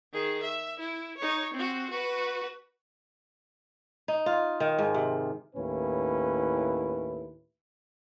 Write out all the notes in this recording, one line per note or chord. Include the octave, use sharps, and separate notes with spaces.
D#3 G#4
E5
E4
D#4 C#5
C4 F#4
F#4 B4
D#4
F4
D#3
G#2
C3
D#2 A2 C#4 E4 B4